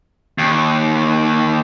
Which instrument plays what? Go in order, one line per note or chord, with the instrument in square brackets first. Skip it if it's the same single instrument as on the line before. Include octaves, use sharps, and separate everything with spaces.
[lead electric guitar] D#2